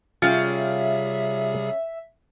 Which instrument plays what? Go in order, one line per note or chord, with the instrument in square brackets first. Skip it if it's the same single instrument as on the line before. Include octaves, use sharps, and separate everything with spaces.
[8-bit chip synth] C3 G3 G#4 [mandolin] C#4 F5 G5 [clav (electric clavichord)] F4 [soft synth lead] E5